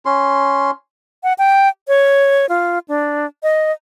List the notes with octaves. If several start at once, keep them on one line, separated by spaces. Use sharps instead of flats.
C#4 C6
F#5
G5
C#5
F4
D4
D#5